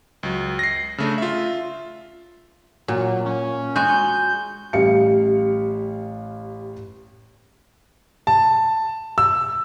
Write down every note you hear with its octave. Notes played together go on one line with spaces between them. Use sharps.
C#2 F#3
A#6 C7
C#3 A3 D4
F4 E5
A#2 F#3
C#4
G#3 F#4 G#5 G6
A1 G3 F5 C#7
A5
E6